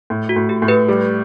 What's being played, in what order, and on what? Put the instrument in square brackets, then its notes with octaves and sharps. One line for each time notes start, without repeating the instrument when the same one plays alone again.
[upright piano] A2
[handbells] F#4
[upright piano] A2
[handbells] G4
[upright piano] A2
[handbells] G4 B4
[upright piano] G3